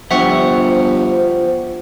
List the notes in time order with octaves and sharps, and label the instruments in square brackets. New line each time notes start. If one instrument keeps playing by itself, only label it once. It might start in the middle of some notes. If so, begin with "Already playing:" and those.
[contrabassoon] G1 [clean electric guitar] F3 G4 [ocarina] C5 [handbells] E5 F#5 C#6